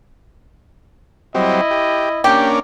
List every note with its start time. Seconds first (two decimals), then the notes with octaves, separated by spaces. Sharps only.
1.35 F#3 G3 C4 E4 D#5
1.71 G4
2.24 A#3 C#4 D4 G4